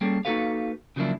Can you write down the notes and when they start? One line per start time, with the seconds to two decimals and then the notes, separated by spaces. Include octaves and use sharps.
0.01 G3 A#3 C#4 G#4 A4
0.25 A#3 D#4 F#4 A4 B4 F5
0.96 C#3 F3 F#3 A#3 D4 E4